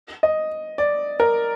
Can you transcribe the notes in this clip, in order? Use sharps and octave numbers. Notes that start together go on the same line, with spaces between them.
D#5
D5
A#4